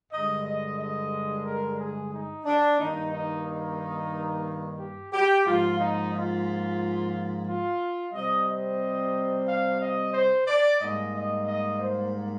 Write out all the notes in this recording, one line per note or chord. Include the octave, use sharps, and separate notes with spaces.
G2 D3 G#3 D#5
D#5
D#5
A#4
G#4
D#4
D4
G2 D#3 A#3 D#4
D#4
D#4
G4
G4
G#2 F3 A#3 F4
D#4
F4
F4
C3 G3 C4 D#5
D#5
F5
D#5
C5
D5
G#2 G3 A#3 D#5
D#5
D#5
C5